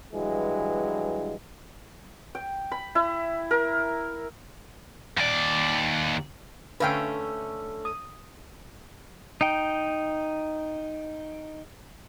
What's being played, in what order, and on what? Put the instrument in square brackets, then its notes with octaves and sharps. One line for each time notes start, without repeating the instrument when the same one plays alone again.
[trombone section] G2 E3 F#3 G#3
[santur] G5
B5
E4
A#4
[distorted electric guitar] D#2 D5
[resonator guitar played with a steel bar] D3 A3 C#4 [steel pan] B4 F5 G5
[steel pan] D#6
[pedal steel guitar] D#4 G5